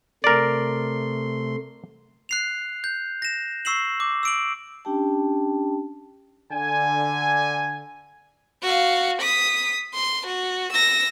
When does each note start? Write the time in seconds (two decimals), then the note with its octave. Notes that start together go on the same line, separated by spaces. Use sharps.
0.24 C3 A3 A#4 D5 C6
2.29 F#6 C7 F7
2.84 G6
3.22 A#6 E7
3.65 C#6 E6 C7 E7 F#7
4.00 D6
4.23 E6 D7 F#7
4.85 C#4 D4 G4 G5 A5
6.52 D3 G#5
8.63 F#4 F5
9.21 D#6 B6
9.94 C6
10.26 F#4
10.72 E6 A#6